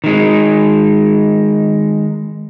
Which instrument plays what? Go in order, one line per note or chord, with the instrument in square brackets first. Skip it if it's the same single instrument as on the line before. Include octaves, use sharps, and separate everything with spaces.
[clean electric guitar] D#3 G#3